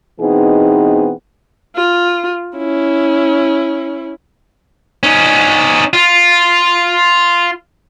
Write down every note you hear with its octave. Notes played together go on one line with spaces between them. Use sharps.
B2 E3 B3 C4 D#4 G#4
F4
C#4 E4
C#4 D#4
F4